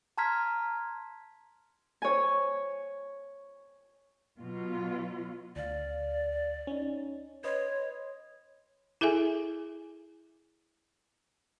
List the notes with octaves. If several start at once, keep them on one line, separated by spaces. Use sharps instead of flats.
A5 A#5 C6 F6 G#6 B6
C#5 G#5
B2 F#3 F4
D2 D5 F5
C#4 D#4
B4 C#5 D#5 C6
E4 G#4 A4 E5 G#5